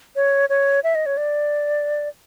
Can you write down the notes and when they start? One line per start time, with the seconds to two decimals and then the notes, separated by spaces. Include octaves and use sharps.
0.16 C#5
0.49 C#5
0.84 E5
0.95 D#5
1.06 C#5
1.17 D5